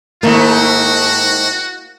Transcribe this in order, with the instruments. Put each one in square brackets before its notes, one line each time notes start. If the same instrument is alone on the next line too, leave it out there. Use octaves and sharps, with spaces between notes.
[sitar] G#2 D#3 A3 [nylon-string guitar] A#3 E4 [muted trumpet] F#4